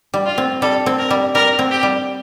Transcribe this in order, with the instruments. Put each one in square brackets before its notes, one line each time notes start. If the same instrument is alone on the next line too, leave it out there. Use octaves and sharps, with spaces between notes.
[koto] G3
[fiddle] F4
[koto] C4
[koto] G3 [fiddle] A4
[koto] C4
[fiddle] A#4
[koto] G3
[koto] G3 [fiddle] A#4
[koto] C4
[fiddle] G4
[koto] G3